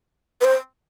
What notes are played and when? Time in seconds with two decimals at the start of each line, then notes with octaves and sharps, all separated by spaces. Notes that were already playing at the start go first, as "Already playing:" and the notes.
0.41 B4
0.44 C5